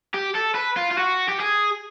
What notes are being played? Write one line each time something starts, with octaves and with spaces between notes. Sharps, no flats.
G4
A4
B4
F4
F4
F#4
G4
G#4